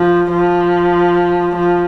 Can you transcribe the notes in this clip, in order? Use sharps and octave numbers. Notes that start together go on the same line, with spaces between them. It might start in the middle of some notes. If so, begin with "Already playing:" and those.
Already playing: F3
F3
F3